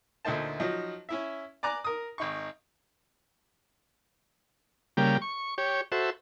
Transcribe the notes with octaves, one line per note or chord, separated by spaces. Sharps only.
D2 A#2 A3 D#4 C5 A5
F3 F#3 D#4
C#4 E4 E5
D5 G#5 A#5 D6 F#6
A#4 D#6
G#1 D#4 C#6
C#3 G3 A#3 G4
C#6
G4 C#5
F#4 A4 C5 E5